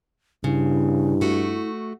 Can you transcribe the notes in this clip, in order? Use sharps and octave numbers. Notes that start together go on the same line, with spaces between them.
G2 C#3 E4
A3 F#4